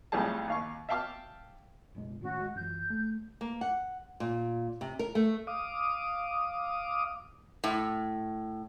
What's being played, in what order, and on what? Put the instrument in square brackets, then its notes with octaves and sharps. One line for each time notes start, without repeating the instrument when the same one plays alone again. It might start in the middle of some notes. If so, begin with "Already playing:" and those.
[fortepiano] B1 F2 A2 G3 G#4 A5
D#2 F5 C#6
E5 F5 G5 A5 D6 F6
[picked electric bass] F#1 B2 G#3
[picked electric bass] A2 D#3 C#4 [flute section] F#4
[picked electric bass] G#3
[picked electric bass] F#2 E3 [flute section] G6
[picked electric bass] A3
[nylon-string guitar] A#3
F#5
A#2
C3
A#4
A3
[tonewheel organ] F5 D6 D#6
[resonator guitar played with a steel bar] A2